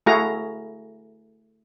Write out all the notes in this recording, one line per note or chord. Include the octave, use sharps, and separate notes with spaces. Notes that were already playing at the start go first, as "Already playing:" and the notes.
A3 E4 F#4 G#4 F5 A#5